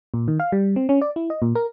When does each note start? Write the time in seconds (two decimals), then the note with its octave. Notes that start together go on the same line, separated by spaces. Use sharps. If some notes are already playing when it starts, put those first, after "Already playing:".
0.14 A#2
0.28 D#3
0.40 F5
0.52 G3
0.76 C4
0.89 C#4
1.01 D5
1.16 E4
1.30 D#5
1.42 A#2
1.55 A#4